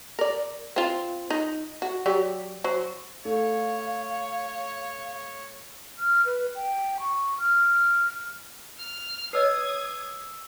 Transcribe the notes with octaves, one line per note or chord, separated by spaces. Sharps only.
A#4 D5
C4 F4
D#4
F#4
F#3 G4 D5
F#3 C5
A3 C#5 F5
F6
B4
G5
C#6
F6
F6
B4 C#5 D#5 D#6 E6 G#6 C7